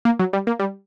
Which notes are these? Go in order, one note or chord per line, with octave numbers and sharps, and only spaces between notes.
A#3
F#3
G3
A#3
G3